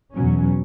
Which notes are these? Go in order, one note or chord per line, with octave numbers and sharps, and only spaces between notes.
E2 B2 F#3 C#4